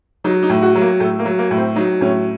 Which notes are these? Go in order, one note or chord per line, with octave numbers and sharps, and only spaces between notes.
F#3 D#4
D#4
A2
F#4
F#3
A#3
A2 A3
A#3
F#3
A#3
A2
C4
F#3 D#4
A2 C#4